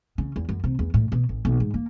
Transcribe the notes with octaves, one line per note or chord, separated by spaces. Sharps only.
C#3
E2
F#2
C3
E2
A2
B2
A1
B1
G#2
A#3